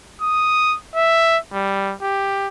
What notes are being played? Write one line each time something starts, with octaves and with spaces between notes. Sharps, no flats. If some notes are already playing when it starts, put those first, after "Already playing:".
D#6
E5
G3
G4